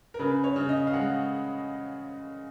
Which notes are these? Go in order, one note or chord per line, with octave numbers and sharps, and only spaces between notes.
A#4
C#3 B4
C#5
C#3
D#5
F5
G#3 F#5